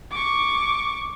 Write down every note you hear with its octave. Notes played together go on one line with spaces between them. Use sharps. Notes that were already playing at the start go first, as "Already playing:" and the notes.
C#6 D6